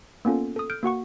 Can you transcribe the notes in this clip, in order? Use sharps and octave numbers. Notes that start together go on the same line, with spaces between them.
A#3 B3 C#4 F4 A4
A4 D#6
F6 G6 D7
A#3 F#4 F#5 C#6